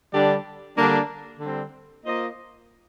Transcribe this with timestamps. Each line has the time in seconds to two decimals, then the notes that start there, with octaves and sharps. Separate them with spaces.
0.11 D3 G3 D4 G4 D5
0.76 D3 G3 A#3 D4
1.40 D3 G3 C4
2.05 A#3 F4 C5 D#5